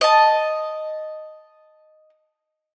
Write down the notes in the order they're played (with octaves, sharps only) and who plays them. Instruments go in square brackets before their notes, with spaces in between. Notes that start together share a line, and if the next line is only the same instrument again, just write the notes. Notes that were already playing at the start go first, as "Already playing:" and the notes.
[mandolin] D#5 A5